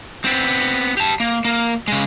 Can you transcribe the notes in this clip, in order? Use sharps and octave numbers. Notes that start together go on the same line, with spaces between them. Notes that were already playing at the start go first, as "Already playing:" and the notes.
B3 C4
G4 A5
A#3
A#3
C#3 G#3